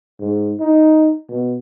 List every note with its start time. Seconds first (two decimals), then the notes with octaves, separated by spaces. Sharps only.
0.20 G#2
0.60 D#4
1.29 B2